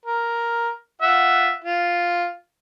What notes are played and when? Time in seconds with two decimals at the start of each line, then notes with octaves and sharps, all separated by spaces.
0.06 A#4
1.02 F4 E5 F#5
1.64 F4